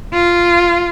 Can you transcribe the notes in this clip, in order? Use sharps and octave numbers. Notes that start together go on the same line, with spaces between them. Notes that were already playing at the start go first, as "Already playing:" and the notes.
F4